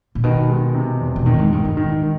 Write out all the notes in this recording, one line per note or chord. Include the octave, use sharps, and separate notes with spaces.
A#2
B2 D#3
G#3
C3
E2
B2
A#2 D#3
A2
G#2
G2 D#3
G#2
D#3
D#3